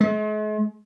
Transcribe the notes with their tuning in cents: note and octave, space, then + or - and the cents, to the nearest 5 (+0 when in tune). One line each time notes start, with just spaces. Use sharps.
G#3 +45